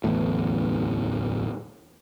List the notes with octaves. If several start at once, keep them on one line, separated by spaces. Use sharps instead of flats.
D1 A1 E2 A2